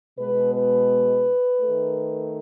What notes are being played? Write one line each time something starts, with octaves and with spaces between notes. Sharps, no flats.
B2 G#3 B4
B4
D#3 A3